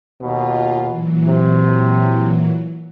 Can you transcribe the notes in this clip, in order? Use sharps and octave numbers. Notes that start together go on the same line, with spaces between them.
D#2 B2 F4
A#2 E3 F#3
C3